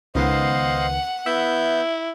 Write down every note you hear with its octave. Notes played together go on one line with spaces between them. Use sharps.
C#2 D#3 B3 C5 D#5 F5 F#5
B3 E4 E5 G6